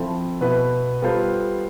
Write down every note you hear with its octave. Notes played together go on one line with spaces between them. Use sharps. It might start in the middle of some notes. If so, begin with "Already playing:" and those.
Already playing: F3 C4 E4 A4
B2 B3 E4 B4
G3 B3 F4 A4 C5